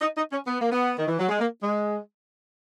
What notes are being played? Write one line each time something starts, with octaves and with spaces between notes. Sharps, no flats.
D#4
D#4
C#4
B3
A#3
B3
D#3
E3
F#3
G#3
A#3
G#3